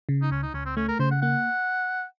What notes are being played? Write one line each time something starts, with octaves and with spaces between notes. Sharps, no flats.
C#3
D#4
C#2 C#4
D#4
C#2 C#4
C4
A3 C#4
A#4
C#3 C5
F#5
A#3 F#5